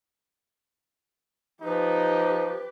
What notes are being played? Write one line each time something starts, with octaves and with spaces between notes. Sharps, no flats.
F3 D#4 G4 B4